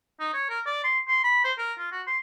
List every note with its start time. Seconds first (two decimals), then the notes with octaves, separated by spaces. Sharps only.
0.20 D#4
0.34 C#5
0.50 A#4
0.66 D5
0.84 C6
1.08 C6
1.24 B5
1.44 C5
1.58 A#4
1.78 F4
1.92 F#4
2.07 C6